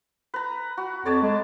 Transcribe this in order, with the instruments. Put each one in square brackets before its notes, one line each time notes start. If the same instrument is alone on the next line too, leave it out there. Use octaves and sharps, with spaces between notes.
[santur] B4 A#5
F#4
[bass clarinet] F2 [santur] C#5 D5 A5
[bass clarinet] G#3